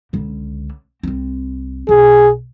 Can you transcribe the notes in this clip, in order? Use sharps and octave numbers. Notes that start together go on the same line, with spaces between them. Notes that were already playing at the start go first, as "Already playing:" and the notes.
C#2 D3
C2 C4
B1 G#4